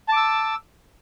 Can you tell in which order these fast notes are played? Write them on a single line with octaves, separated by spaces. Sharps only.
A5 D6 E6